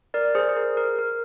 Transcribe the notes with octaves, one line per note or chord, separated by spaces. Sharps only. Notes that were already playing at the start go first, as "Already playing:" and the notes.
A#4 D5
G#4 C5
G#4
A#4
A#4
A#4